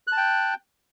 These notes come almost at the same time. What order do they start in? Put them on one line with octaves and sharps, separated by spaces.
F#6 A5 G5